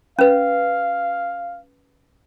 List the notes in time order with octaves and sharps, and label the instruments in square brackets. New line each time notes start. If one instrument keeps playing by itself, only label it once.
[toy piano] C#4 B4 [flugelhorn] F5